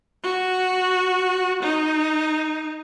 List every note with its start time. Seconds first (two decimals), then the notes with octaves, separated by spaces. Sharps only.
0.23 F#4
1.62 D#4